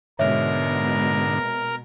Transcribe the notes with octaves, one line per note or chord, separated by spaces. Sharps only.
G#2 B2 D3 G#3 A#4 C#5 E5